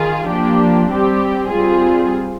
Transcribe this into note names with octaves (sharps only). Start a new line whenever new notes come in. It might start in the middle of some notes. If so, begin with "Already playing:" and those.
Already playing: D#3 F4 G#4
F3 A#3 D4 G4
G3 C4 G4
G3 C4 F4 G#4